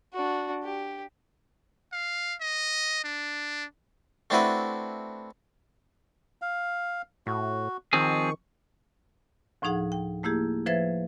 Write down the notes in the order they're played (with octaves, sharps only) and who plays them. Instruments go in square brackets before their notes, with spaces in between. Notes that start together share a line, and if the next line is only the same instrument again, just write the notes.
[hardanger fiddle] D4 F#4
G4
[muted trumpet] F5
D#5
D4
[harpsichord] A3 C4 D4 E4 F#4 B4
[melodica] F5
[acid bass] A2 [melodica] F#4
[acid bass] D#3 [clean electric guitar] F3 C4 G#4 [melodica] C#6
[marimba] D2 A2 F3 D#4 G#4 F#5
G5
A3 A#3 E4 G4 G#4
F3 B4 C5 E5 G#6 A6